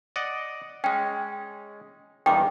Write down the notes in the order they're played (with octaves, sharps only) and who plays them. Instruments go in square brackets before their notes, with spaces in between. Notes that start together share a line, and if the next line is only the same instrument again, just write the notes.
[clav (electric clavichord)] D5 D#5 F#5
[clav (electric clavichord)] G#3 C#4 [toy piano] G5
[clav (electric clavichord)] E2 G2 D#3 [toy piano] G5 D6